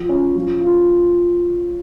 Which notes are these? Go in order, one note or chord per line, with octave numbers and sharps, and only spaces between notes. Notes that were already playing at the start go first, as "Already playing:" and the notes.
Already playing: F3
C#4
F3
F4